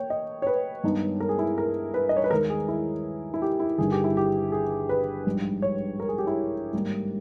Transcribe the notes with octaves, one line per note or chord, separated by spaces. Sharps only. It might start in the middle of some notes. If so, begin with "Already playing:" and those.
Already playing: A#3 C#5 G5
D#5
C#5
B4
G2 D#3 G#3 B3 D#4
A#4
G#4
E4
A#4
B4
D#5
C#5
B4
D#2 D#3 G#3 A#4
G#4
E4
E4
G4
E4
G1 G2 D#3 G#4
G4
E4
G4
G#4
B4
A#1 G#2 G3
C#5
A#4
G#4
G4
E4
G#2 D#3 G3 A#3 D#4